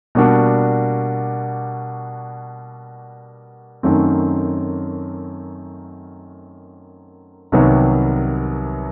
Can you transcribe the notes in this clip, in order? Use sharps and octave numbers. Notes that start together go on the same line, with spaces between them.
B2 G3 A#3 D4 F#4
F#2 D#3 F#3 A3 C4
C2 C3 D#3 F#3 B3